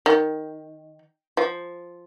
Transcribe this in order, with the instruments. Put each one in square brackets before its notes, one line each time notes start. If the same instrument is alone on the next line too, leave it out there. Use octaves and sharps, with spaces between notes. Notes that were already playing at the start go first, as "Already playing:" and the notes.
[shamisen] D#3
F3